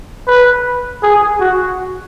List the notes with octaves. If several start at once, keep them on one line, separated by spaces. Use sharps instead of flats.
B4
G#4
F#4